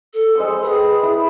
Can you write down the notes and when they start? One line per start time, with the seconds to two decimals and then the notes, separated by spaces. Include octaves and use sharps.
0.14 A4
0.35 G#3 C5 D#6
0.63 G#4 B4 G5
1.03 E4